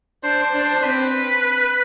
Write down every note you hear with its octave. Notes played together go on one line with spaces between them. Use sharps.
D4 C5
C5
D4
C5
C4 B4